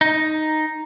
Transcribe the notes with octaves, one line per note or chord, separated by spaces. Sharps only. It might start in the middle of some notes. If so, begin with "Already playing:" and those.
D#4